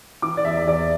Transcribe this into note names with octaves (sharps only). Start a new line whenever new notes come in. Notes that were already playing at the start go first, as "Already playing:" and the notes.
E3 D6
D5
E2 E5
E5
E2 D5